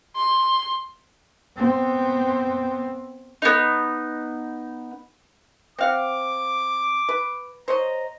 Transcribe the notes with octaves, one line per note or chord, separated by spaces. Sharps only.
C6
B3 C4
B3 D#4
C4 F5 F#5 D6
B4
C5 C#5 D#5 A#5